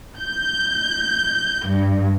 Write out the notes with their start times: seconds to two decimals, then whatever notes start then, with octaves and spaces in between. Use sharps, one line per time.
0.18 G6
1.67 G2